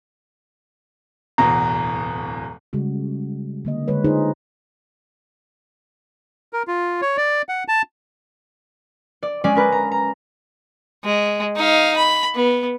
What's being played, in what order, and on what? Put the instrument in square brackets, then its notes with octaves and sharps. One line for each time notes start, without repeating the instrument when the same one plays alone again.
[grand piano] D1 E2 B2 [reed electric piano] A#5
[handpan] C#3 G3 G#3 F#4
D3 A#3 D#5
D3 G#3 B4 C#5
D3 D#4 F4 G#4 C5
[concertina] A#4
F4
C#5
D5
F#5
A5
[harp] D5
G#3 C#4 D5
C#4 A#4 B4
A#5
A#5
[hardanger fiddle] G#3
D#4 F5
B5
B3